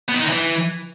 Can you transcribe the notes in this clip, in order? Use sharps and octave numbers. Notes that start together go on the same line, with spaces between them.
B3
D#3
D#4
D3
E3